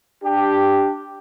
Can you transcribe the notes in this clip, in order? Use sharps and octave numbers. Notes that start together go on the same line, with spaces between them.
D4 G4